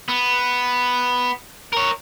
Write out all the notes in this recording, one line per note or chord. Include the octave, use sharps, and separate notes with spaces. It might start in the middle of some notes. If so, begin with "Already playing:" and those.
B3
A#4 C#5